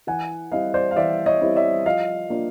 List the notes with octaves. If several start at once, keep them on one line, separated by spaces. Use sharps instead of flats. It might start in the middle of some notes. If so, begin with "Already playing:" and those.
E3 F#5 G#5
G3 C4 E4 D#5 F5
C5 D5
F5
E3 D5 E5
C#5 D#5
G3 C4 E4
D5 E5
F3 D#5 F5
A#3 D4 F4